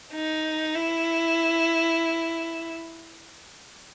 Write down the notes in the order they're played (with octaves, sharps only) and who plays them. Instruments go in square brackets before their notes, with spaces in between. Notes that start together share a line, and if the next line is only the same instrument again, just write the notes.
[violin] D#4
E4